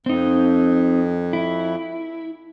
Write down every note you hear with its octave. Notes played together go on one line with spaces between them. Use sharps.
F2 C4 D#4
E4